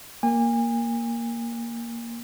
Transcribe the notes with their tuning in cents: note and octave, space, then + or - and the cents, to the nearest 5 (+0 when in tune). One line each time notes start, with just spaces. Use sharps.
A#3 +0 G#5 -35